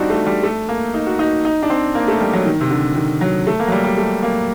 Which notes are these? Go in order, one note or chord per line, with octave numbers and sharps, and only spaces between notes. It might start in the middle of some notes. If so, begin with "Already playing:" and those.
Already playing: G3 C4 D4 D#4 F#4
A3
G3
A3
A#3
D#4
F#4
D#4
D#4
D4
C4
A#3
A3
G3
F#3
D#3
C3
D3
D#3
F#3
A3
A#3
F#3
G3
G3
A3
A#3